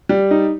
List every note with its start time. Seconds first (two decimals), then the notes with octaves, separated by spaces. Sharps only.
0.09 G3
0.31 D#4